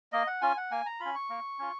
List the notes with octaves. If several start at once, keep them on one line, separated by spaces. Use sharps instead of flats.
A#3 D#5
F#5
C#4 F4 G#5
F#5
A#3 G#5
A#5
C#4 F4 B5
C#6
A#3
C#4 F4